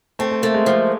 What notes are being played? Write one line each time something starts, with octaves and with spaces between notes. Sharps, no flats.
A3 C4
A3
A3 A#3
G#3
F3